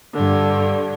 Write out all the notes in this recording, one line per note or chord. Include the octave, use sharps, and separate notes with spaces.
G2 D3